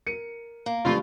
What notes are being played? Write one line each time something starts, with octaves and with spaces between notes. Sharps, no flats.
A#4 C#7 D#7
A#3
G2 D3 F3 A3 F4